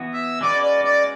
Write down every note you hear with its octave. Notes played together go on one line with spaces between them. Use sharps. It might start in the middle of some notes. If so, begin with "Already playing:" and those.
Already playing: E3 B3 F#4
E5
G#3 C#4 F#4 B4 D5
D5
D5